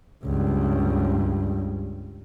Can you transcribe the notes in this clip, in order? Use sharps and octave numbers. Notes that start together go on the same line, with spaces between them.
C#2 G2